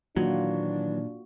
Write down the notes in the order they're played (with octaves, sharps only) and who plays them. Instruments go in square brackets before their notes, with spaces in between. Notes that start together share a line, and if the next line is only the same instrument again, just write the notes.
[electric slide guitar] A#2 [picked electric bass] D#3 E3 F#3 [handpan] A#3 F4 F#4 [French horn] D4